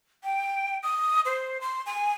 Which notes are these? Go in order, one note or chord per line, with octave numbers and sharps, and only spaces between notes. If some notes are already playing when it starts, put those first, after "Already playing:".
G5
D#6
C5
C6
G#5